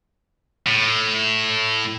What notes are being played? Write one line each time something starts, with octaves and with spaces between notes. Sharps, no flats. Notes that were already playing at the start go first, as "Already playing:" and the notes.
A2